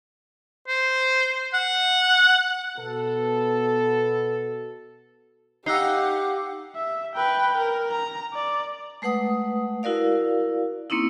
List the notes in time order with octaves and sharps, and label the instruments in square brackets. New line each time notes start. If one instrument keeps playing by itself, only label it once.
[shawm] C5
F#5
[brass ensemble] B2 B3 F#4 A4
[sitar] D#4 [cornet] G4 [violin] F5 F#5 [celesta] E6 F#6 C7
[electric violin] E5
B4 G5
A#4
A#5
D5
[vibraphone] G#3 A3 B4 F#5 D#6
E4 F#4 A#4 D5 F5
A#3 C4 C#4 D#4 E4